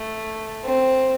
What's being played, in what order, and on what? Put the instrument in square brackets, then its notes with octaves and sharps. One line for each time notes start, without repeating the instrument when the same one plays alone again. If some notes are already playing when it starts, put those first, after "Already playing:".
Already playing: [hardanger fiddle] A3
C4